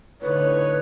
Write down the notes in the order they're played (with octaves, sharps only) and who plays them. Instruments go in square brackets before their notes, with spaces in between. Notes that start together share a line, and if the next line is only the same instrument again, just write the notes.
[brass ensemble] A2 C#5 [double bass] D3 D#4 [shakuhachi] B4